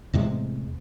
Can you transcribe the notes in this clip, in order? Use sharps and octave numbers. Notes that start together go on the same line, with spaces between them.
E2 A2 C3 G#3